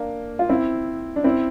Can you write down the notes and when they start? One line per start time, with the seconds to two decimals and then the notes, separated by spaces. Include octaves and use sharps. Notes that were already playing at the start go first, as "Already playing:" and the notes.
Already playing: A#3 D4
0.39 F4
0.49 C4 E4
1.16 D4
1.24 C4 E4